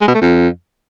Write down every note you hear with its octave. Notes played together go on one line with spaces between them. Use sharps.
G#3
B2
A3
F2